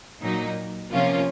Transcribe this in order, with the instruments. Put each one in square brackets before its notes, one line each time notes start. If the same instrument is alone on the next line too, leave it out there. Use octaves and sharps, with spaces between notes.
[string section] A#2 F#3 A#3 D#4
C3 F3 A#3 C#4 F4